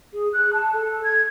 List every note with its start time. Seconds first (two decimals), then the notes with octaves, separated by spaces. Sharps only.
0.13 G#4
0.33 F#6
0.53 A5
0.73 A4
1.03 G#6